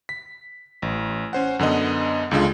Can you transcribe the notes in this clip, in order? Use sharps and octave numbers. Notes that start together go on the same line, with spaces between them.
B6
A1
C#4 C5 F#5
F#2 D3 B3 D#5
C#2 D3 G#3 F4